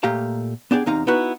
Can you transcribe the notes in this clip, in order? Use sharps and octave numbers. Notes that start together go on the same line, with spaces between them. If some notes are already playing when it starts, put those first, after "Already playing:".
A#2 A3 A#3 G4 F5 A#5
B3 D4 G4 G#4 D5
E2 C3 D#4 F5 A#5
B3 D#4 E4 F#4 B4